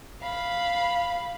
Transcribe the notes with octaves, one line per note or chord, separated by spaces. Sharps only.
F5 B5